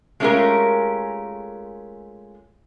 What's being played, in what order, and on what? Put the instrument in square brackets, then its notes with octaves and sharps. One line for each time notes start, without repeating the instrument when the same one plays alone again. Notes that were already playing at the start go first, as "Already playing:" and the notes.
[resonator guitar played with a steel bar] G#3 A3 C#4 F4 G4 A#4